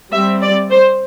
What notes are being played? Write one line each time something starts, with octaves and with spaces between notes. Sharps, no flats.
G3 C4 E5
D5
C5